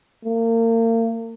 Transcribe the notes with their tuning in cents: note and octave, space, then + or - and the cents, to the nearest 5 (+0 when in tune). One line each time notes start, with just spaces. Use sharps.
A#3 -35